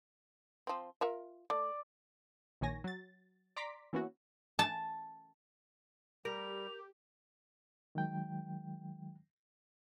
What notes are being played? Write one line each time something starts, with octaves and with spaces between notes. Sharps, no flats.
F3 C4
F4 A#4 E5
A3 D5
A#1 D#3 A#3 C#5 G#5 A#6
F#3 A6
D5 A#5 C6 D6 B6
E3 A#3 B3 C#4 E4 F#4
A5
G3 G4 A#4 F7
D#3 F#3 G#3 G5